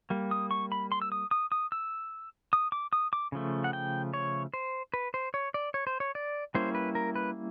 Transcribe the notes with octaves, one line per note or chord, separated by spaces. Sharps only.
G3 A#3
D#6
C#6
B5
C6
E6
D#6
D#6
D#6
E6
D#6
D6
D#6
D6
C#3 F3 A3
F#5
G5
C#5
C5
B4
C5
C#5
D5
C#5
C5
C#5
D5
G3 A#3 C#4 E4 C5
B4
A#4
B4